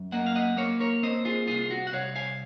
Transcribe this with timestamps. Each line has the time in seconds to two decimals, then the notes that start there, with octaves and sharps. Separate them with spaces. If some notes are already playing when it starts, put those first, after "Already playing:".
Already playing: F#2
0.12 A#3 D#5 F#5
0.26 F5
0.35 D#5 F#5
0.57 A#3 C#5 F5
0.80 A#4 C#5
1.03 C4 C5 D#5
1.25 F4 G#4
1.47 C2 F4 G#4
1.71 F#4
1.87 F#5
1.93 C2 C#5 F5
2.16 F5 G#5